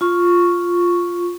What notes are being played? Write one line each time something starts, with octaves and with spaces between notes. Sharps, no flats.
F4 C#6